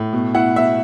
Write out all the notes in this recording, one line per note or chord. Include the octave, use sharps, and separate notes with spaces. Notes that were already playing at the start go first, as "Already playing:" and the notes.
Already playing: A2
B2
E4 F#5
B2 E5